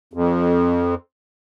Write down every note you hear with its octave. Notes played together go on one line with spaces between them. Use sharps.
F2